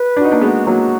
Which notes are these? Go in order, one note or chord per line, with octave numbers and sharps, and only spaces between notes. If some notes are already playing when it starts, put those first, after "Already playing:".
Already playing: B4
D4 F#4
D#4
A#3 D4
G#3 B3 F#4
F#3 A#3 F#4